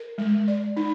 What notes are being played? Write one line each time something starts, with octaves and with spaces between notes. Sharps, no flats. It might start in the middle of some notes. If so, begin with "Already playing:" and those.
Already playing: A#4
G#3
D5
D#4